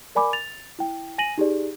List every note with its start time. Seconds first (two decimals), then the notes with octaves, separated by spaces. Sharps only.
0.15 A#4 D5 G#5 B5 D6
0.33 A6 F7
0.79 E4 G5
1.18 G#5 A#6 D#7 F#7
1.38 D#4 G4 G#4 D5